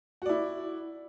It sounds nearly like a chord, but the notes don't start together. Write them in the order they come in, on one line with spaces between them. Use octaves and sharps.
F#4 D5 E4